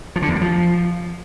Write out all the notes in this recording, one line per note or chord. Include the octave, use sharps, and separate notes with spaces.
F3
D3
E2
G3
F3